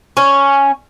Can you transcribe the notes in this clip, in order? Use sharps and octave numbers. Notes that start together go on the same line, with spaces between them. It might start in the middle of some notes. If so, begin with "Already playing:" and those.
C#4